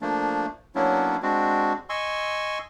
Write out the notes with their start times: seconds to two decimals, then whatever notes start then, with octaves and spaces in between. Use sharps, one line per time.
0.02 F3 A3 A#3 D4
0.75 F#3 A#3 B3 C#4 D4 E4
1.23 G#3 C4 D4 F#4
1.89 D#5 G#5 C6 C#6 E6